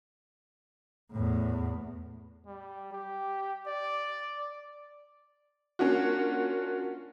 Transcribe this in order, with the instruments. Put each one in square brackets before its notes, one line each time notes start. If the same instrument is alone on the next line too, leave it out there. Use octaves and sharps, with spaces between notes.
[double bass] E2 A2
[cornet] G3
G4
D5
[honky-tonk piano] A#3 C#4 D4 F4 F#4